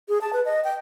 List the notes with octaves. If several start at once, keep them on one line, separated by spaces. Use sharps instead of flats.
G#4
A5
B4
D#5
G5